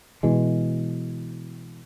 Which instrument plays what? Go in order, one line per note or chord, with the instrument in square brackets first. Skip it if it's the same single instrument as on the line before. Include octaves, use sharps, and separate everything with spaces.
[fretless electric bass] B2 E3 G#3